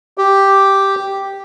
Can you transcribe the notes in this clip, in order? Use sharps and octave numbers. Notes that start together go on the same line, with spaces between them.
G4